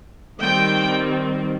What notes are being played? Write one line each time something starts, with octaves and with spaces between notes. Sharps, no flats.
D#3 G3 C4 G5